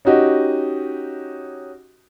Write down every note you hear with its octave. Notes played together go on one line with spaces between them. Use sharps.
C#4 D#4 F#4 G4 D#5